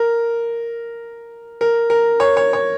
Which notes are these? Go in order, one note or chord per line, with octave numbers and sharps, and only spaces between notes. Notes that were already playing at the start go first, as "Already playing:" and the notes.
Already playing: A#4
A#4
A#4
C#5
C#5
C#5